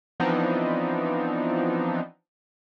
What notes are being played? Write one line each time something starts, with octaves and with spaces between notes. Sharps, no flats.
E3 F3 B3 C4 D4 D#4